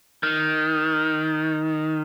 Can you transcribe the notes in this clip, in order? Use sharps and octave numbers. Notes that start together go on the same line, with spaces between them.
D#3